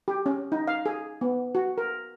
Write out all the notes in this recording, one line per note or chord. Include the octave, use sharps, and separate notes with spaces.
G4
C#4
D#4
F5
G#4
B3
F#4
A#4